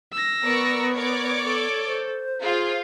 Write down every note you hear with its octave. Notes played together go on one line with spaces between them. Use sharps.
E6 A#6
B3 A#4 D5 C#6
A#4 C#5 D5 D6
A4
C5
F4 G#4